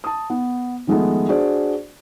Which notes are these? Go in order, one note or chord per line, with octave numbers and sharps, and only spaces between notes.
A5 D#6
B3
D#3 F3 G#3 A3 B3
D4 F#4 G#4 C5 D5